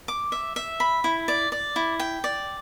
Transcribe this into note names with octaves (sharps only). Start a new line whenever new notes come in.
D6
E5
E5
B5
E4
D5
D5
E4
G5
D5